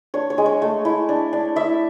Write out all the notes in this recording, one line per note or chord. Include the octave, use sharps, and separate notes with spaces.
D4 C#5
C#5
G#3
C#5
A3
E4
D4
D4
E4 E5